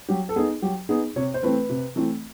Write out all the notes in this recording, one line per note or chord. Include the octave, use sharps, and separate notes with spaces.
F#3 G4
A4
B3 D#4 G#4
F#3 G4
B3 D#4 G#4
C3 C#5
C5
E3 A3 C4 B4
C3
E3 A3 C4